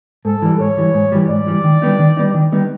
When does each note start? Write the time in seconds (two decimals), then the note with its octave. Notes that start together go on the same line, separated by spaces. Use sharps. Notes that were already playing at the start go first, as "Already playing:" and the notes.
0.25 G#2 A4
0.42 E3 G3
0.60 G#2 C#5
0.77 E3 G3
0.94 G#2
1.12 E3 G3
1.29 G#2 D5
1.46 E3 G3
1.64 D#3
1.82 G3 B3 D#4
1.99 D#3
2.17 G3 B3 D#4
2.34 D#3
2.52 G3 B3 D#4